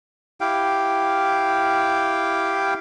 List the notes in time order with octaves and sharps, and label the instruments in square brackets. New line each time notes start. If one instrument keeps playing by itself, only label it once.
[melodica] E4 G4 F5 G5